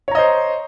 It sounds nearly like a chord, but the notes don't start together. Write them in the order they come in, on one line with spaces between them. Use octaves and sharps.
C#5 A#5 D#5 C5